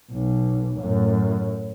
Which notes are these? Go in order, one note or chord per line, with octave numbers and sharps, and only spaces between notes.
B1
F#2 A2